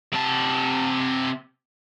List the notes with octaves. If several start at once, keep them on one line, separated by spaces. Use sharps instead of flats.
C3 A5